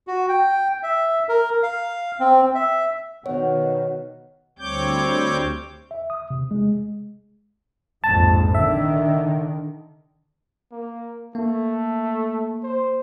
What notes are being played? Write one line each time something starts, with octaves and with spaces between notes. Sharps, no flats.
F#4
G5
E5
A#4
F5
C4
E5
B2 D#3 C#5 F#5
D2 G3 C4 C#5 D6 G6
E5
D#6
C3
G#3
A#1 F2 G#2 A5
D3 D#3 E5
A#3
A3 A#3
C5